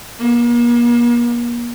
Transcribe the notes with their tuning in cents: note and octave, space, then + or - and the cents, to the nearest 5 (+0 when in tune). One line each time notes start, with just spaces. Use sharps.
A#3 +40